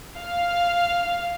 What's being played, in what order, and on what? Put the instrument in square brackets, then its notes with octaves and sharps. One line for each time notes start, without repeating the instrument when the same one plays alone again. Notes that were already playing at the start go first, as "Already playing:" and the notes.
[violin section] F5